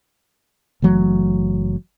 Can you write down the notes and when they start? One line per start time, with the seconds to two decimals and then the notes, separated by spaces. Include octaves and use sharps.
0.82 F#1 E3 F#3 A3